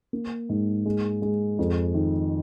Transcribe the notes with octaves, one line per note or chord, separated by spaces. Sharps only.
A#3
G#2
G#3
G#3
F2
D#3